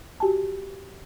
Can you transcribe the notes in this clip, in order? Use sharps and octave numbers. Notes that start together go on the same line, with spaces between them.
F#4 G4 G#5 A5